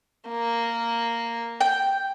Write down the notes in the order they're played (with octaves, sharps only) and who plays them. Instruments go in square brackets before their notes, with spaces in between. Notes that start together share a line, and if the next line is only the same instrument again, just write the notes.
[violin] A#3
[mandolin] G5